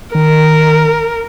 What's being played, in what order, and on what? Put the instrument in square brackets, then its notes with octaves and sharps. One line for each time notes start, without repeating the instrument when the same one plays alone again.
[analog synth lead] D#3 [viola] A#4